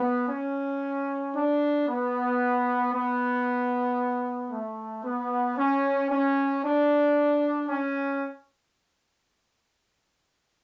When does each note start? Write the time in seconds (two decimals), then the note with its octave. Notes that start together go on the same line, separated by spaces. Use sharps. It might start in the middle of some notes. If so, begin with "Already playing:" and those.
Already playing: B3
0.29 C#4
1.34 D4
1.87 B3
2.93 B3
4.52 A3
5.05 B3
5.58 C#4
6.11 C#4
6.63 D4
7.69 C#4